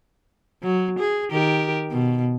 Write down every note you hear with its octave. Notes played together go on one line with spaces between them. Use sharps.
F#3
G#4
D#3 G4 A#4
B2